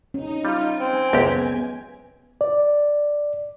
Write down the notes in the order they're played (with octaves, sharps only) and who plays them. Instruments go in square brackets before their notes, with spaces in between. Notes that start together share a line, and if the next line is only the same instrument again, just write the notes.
[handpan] C#4 [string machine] D#4
[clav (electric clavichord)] G3 [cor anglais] F4
[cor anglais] C4 [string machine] G#5
[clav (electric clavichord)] C#2 F#2 G4 [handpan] B3
[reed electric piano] D5